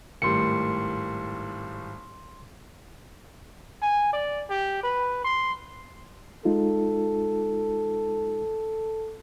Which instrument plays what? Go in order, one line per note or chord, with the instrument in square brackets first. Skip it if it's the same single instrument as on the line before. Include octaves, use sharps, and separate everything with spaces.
[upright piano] G#1 A2 G3 [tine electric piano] C6 C#7
[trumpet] G#5
D5
G4
B4
C6
[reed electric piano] G#3 D#4 F4 [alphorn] A4